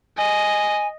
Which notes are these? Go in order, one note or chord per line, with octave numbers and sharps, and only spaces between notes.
D#5 G#5